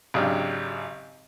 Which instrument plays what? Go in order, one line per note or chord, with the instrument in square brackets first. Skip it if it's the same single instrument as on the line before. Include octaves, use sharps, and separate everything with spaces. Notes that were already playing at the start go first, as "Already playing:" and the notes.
[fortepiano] G#1 C#3 F#3 D4 G4 F6